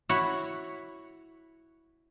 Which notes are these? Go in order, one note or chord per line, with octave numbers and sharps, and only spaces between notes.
E4 F#4 C#5